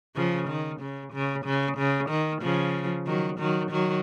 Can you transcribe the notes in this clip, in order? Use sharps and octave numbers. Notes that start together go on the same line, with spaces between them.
C#3 F3
D#3
C#3
C#3
C#3
C#3
D#3
C#3 F3
D#3 F#3
D#3 F#3
D#3 F#3